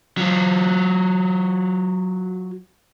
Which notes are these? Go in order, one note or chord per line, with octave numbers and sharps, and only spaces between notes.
F#3 F4